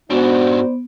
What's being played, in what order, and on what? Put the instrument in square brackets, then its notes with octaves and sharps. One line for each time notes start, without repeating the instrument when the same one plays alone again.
[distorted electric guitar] G#2 D4 [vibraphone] B3 [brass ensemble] D#4 C5 D5 [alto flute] F#4